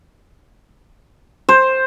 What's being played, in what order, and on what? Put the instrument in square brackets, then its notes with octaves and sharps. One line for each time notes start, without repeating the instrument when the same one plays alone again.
[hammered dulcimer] C5